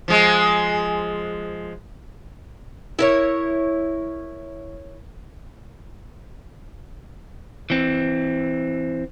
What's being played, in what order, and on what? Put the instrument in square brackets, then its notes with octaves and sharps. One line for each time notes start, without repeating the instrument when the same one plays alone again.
[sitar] F3 G#3
[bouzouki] E4 A#4 C#5
[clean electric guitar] E3 C4